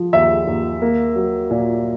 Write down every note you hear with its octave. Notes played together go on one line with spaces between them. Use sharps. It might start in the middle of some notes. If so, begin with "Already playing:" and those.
Already playing: F3
D#2 E5
D#2
A#3
F#3
A#2